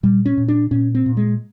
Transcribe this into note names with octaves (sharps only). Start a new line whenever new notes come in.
A#2 G3
C#4
A#2
D4
A#2 C#4
C4
A#2
G#3